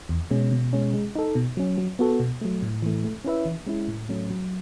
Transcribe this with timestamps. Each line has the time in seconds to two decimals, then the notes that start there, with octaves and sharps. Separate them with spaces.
0.09 E2
0.31 B2 G#3 C#4
0.52 B2
0.73 G#3 C#4
0.94 G#3
1.15 D#4 A4
1.35 B2
1.57 F#3 C#4
1.78 F#3
1.99 B3 F#4 A4
2.20 B2
2.41 F#3 A3
2.63 A2
2.82 E3 A3
3.04 A3
3.24 C#4 E4 B4 E5
3.46 E3
3.66 G#3 C#4 E4
3.88 A2
4.09 F#3 A3 C#4
4.30 F#3